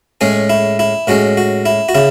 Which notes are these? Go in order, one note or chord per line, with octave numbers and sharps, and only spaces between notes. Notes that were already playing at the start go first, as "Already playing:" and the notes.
A2 G#3 C#4 G#4
E4
E4
A2 G#3 C#4 F#4
F#4
E4
F#4
C#3 E4